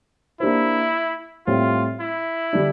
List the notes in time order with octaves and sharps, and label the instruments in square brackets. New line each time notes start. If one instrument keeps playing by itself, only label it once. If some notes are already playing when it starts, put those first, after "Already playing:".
[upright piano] A#3 D4 G4 C5 [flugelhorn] E4
[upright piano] A2 G3 C4 [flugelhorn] F4
[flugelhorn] E4
[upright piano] D3 G3 D4